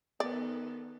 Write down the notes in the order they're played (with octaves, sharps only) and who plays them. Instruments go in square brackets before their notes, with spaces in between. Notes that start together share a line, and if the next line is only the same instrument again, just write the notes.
[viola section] D#3 B3 A4 [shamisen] D5